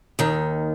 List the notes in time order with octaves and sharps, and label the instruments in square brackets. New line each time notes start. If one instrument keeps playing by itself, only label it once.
[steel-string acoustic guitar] D#2 D#3